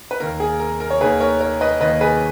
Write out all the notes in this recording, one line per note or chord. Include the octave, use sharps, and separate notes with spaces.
B4
D#2 D#3 A#3 A#4
G#4
A#4
A#4
C#5
D#2 D#3 A#3 G#4 B4
A#4 C#5
A#4 C#5
B4 D#5
D#2 D#3 A#3 B4 D#5
G#4 B4